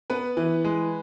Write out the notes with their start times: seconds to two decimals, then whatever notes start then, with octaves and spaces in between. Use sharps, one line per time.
0.10 B3 B4
0.37 E3
0.64 G#3